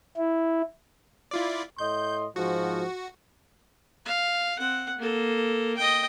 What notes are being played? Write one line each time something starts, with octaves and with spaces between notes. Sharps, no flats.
E4
E4 F4 D5
A2 D#5 C6 G6
G#2 F3 F#4
F5
C4 F#5
A#3 A4
D#5 G5